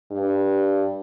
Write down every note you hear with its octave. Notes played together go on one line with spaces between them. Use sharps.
G2